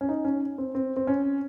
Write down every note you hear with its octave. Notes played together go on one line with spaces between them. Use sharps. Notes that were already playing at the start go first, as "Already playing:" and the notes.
C#4
D#4
C#4
C4
C4
C4
C#4